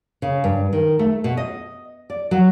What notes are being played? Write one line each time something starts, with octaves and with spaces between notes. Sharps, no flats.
C#3
G2
D#3
A3
B2
D#5
D5
F#3